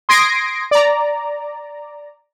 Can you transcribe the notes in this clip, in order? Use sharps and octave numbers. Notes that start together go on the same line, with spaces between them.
C6 D#6 G#6 A#6 C7 D7
D5 A#5